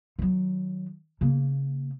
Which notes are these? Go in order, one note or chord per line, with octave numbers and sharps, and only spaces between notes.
D#3 F#3
C#3 A#3